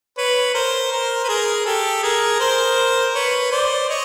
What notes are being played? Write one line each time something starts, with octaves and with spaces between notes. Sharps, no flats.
B4 C#5
A#4 C5
A#4 C5
B4
G#4 A#4
G4 A4
G#4 A#4
A#4 C5
B4 C#5
C5 D5
C#5 D#5